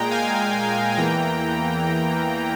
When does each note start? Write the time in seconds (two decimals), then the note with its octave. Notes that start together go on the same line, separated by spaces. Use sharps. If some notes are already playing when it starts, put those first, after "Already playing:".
Already playing: A#2 G#3 G5 A#5
0.11 F5 G#5
0.97 E2 E3 A#3 G5 A#5